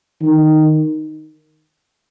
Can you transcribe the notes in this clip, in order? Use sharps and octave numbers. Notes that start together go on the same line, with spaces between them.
D#3